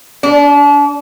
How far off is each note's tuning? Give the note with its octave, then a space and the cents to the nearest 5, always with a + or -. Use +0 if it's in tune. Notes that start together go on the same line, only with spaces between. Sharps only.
D4 -35